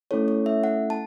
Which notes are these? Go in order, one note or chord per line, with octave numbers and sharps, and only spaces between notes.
A3 C#4 E4 A4 C#5
C#5
E5
F#5
A5